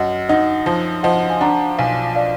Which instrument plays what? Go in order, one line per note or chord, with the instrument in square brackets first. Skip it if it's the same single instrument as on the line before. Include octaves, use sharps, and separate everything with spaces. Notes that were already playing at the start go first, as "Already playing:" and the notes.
Already playing: [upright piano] F#2 [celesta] D#5 F#5
[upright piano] D#4 [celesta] D#5 F#5
[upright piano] F3
[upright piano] F3 [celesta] D#5 F#5
[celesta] G#5
[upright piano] D4 [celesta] F#5 A#5
[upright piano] B1 [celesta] F5 G#5
[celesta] D5 F5